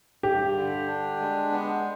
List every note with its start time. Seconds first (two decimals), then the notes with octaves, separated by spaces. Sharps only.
0.23 G2 G4
0.56 D3
0.88 D4
1.20 G#3
1.51 B3